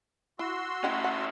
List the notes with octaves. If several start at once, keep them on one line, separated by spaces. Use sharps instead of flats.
E4 F#4 C6 E6
C#4 E4 D#5 F#5 G5
F#5